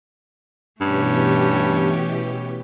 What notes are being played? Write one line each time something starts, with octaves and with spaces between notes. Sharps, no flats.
G2 B2 E3 A3 C#4 G4